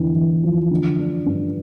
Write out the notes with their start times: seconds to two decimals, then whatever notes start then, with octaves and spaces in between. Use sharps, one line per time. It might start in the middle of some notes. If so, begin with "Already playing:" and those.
Already playing: E2 D3
0.15 E2
0.44 F3
0.71 D3
0.99 D4
1.26 G2